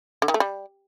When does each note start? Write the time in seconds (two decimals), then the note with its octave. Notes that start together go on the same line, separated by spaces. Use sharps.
0.22 D3
0.28 D#3
0.34 A3
0.40 G3